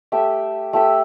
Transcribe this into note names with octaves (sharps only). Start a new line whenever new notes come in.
A3 G4 E5
A3 G4 E5